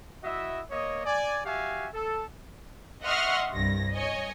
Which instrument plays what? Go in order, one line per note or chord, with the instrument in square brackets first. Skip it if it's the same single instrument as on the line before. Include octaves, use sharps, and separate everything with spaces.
[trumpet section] E4 F#4 D#5 E5
A#3 C#5 D#5
D5 G#5
F#4 G4 E5 F5 G#5
A4
[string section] D#5 E5 F#5 C6 C#6 F6
C2 G2 A#6
C#5 D#5 G#5